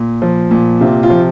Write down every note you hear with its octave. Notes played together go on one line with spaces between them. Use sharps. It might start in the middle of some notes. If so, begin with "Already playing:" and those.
Already playing: A#2
F3
A#2
C3 F4
F4
F3